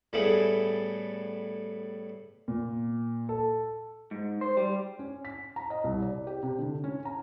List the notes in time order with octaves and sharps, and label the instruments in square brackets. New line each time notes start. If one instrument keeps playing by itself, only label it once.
[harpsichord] A2 G3 A3 B3 E4 G#4
[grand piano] A#2
A4
[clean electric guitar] G#2
C5
G3
[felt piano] C#4
B6
A#5
D#5
C2
D5
G4
C3
D3
C#4
A#5